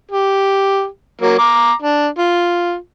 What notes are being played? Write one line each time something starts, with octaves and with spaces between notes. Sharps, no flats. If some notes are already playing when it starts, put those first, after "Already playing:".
G4
F#3 A#3
A#5 D6
D4
F4